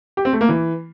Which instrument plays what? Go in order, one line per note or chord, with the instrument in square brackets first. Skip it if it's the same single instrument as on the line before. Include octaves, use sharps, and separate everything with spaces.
[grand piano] G4
C4
A3
A#3
E3